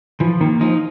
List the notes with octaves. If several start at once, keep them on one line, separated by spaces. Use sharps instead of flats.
E3 F3
D#3 A#3
F3 D#4